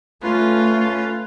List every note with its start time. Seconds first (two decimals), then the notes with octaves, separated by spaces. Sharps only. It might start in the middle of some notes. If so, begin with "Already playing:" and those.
0.23 A3 C#4 F4 B4